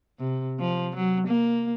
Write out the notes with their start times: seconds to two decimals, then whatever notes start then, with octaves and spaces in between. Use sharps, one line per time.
0.19 C3
0.60 F3
0.96 F#3
1.27 A#3